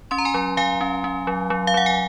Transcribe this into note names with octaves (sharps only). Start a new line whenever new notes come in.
C#4 C6
A#5
G#5 C6
F#3
F#3 F5 G#5
C#4
C#4
F#3
F#3
F5
F#3 F#5
G#5